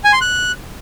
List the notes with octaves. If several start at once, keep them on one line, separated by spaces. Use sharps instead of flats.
G#5
C6
F#6